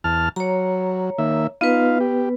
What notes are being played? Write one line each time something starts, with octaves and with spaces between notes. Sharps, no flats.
E2 A5 F6
F#3 C#5 A#5
D#3 A#3 E5
B3 D#4 F4 B4 F5
G4